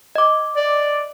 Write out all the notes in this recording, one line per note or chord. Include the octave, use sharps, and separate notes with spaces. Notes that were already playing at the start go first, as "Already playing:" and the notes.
D#5 D6
D5